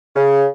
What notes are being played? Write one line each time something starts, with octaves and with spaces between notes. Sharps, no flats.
C#3